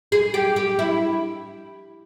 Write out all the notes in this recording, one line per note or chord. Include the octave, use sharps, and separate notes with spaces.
G#4
G4
G4
E4